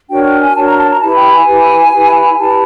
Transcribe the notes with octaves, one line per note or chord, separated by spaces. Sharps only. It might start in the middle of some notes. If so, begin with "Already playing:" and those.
D4 F#4 A#4 C#5 G5
G5
G#5
D4 F#4 A#4 C#5 A5
A#5
A5
A#5
E4 G4 B4 A5
G5
G#5
E4 G4 B4
E4 G4 B4
E4 G4 B4 A5